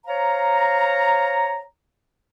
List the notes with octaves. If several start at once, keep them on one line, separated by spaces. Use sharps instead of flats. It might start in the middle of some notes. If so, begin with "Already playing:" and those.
C5 C#5 F5 A#5